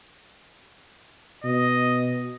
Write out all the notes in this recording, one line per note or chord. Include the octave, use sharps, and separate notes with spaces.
B2 D#5